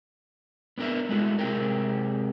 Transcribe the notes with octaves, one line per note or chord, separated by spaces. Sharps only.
B3 D4 A#4 B4 E5
G#3 A3 E4 F#4 A4
C3 G#3 A#3 C4 G4 A#4